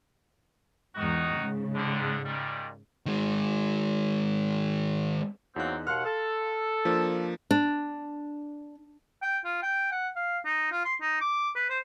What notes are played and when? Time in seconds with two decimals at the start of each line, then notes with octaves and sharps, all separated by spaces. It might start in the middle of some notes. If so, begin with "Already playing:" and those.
0.95 E2 G#2 D#3 D#4 F#4
1.39 G#2 C#3
1.75 F2 D3
2.25 A#2 D#3 G3
3.06 D#3 G#3
5.56 E2 F#3 A#3 C4 D#4 F#6
5.87 D#2 B2 F5 F#5 C6 F6
6.05 A4
6.85 F3 A#3 D4
7.51 D4
9.22 G5
9.44 F4
9.62 G5
9.92 F#5
10.16 F5
10.45 D#4
10.72 F4
10.85 C6
11.01 D#4
11.21 D6
11.55 B4
11.70 C5